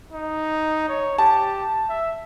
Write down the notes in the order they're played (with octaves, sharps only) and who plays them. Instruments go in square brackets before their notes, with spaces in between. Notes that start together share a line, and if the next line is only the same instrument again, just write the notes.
[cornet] D#4
C#5
[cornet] G4 [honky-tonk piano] A5
[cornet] E5